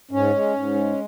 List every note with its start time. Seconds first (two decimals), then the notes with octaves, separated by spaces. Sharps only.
0.11 G#2 C#4
0.33 G#3
0.54 G#2
0.74 G#3